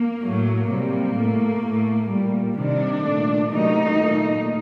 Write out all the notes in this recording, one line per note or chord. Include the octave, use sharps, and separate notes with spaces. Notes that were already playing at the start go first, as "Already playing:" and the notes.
Already playing: A#3
A2 F#3 A3
C3 G3 A#3
A2 A3
A2 A3
A#2 G3
C3 D#3 G3 D4
A#2 A3
C3 D#3 F#3 A3 D#4
A#2 A3